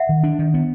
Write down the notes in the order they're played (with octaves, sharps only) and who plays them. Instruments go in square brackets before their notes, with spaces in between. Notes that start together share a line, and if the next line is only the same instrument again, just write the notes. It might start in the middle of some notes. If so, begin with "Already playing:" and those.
Already playing: [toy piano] E5 F#5
[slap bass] D#3
D4
D#3
B3